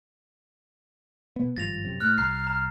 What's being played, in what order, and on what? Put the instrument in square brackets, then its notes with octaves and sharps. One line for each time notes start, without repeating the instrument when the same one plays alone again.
[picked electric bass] B2 B3
[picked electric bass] G#1 G2 F3 [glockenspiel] A6 A#6 F7
[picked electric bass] F#2 C3
[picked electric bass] A2 [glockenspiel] F6 [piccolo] F#6
[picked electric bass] C2 [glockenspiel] A#5 F#6 C7 [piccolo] F6
[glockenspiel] A#5